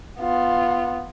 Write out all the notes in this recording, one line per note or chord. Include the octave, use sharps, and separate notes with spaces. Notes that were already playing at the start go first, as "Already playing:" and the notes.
B3 F4